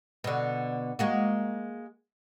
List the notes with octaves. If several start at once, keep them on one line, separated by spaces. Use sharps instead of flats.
B2 D3
G#3 A#3 F#4